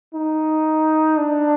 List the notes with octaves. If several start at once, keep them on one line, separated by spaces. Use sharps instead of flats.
D#4
D4